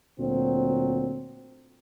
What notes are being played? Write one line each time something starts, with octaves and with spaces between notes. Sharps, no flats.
D2 A#2 F#3 C4